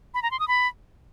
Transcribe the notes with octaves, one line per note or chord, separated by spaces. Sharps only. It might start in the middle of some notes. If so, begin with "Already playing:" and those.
B5
A#5
C6
D#6
B5